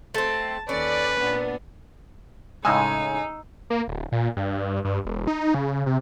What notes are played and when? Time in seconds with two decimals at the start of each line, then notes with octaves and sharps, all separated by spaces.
0.14 A3 C4 A5
0.69 D#2 C#4 A4 B4 D5
1.17 A#2 B3 D4
2.65 A2 C#3 G#3 D#4 G#5 E6
3.70 A#3
3.88 D1
4.12 A#2
4.37 G2
4.85 G2
5.05 E1
5.27 D#4
5.54 C#3
5.86 C3